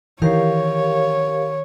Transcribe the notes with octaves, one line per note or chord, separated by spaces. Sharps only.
D#3 E3 G4 A#4 C#5 F5 C7